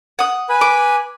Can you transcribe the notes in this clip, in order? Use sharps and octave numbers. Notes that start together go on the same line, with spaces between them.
F#5 D#6
B4 G#5 B5
D6